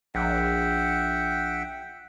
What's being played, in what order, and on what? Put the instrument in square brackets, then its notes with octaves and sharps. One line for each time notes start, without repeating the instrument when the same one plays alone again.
[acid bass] A#1 [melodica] E5 F#5 G5